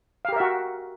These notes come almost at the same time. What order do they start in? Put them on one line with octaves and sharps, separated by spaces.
F5 G4 A#4 E5 F#4